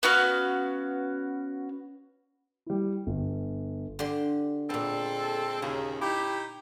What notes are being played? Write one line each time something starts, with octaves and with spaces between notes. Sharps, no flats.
B3 C#4 F#4 F5
G3 E4
G1
D3 G4 C6
A#2 G#3 B3 C4 A4
D#2 C#3 A#5
D#4 E4 G4